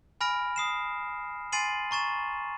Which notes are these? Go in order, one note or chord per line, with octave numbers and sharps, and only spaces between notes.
G#5 B5 F6 A#6 D7
D#6 C7 E7
G#5 C6 A6 C7 D#7 F#7
A#5 C#6 A6 E7